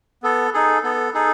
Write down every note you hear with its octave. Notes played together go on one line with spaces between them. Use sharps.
B3 A4
D#4 G#4 A4
B3 A4
D#4 G#4 A4